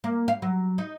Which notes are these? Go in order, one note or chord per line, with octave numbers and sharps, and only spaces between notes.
A#3
F5
F#3
D#4